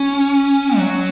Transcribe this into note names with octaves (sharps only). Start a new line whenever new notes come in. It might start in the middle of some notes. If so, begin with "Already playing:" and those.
Already playing: C#4
F#3